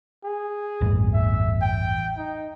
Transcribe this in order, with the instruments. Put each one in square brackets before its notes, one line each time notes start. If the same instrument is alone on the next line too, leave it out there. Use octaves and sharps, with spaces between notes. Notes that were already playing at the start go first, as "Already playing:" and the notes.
[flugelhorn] G#4
[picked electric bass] A1 E2 G2
[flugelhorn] E5
G5
D#4